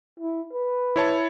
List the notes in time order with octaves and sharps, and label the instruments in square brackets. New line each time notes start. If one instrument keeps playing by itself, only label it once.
[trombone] E4
B4
[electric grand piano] E4 C#5 A5